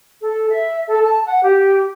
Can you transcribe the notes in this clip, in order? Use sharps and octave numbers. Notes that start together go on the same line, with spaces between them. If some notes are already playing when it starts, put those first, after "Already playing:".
A4
E5
A4
A5
F#5
G4